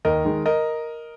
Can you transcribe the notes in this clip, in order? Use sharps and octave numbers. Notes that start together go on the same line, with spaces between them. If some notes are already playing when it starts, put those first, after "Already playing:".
D#2 A#4 D#5
D#3 G#3
A#4 D#5